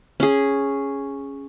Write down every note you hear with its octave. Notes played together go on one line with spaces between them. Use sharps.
C#4 G#4